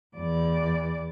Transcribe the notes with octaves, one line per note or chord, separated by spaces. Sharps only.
E2 D5